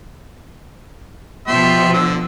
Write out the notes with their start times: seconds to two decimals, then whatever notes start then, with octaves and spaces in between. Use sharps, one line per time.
1.47 B2 F3 G4 E5 C6
1.93 D3 E6